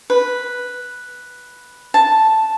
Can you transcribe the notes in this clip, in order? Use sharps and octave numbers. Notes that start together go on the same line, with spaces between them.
B4
A5